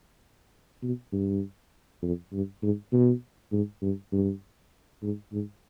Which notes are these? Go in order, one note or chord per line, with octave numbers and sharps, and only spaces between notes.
B2
G2
F2
G2
G#2
B2
G#2
G2
G2
G#2
G#2